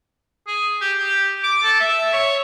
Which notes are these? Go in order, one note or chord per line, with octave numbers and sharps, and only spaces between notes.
G#4
G4
G4
D6
A4
E5
C#5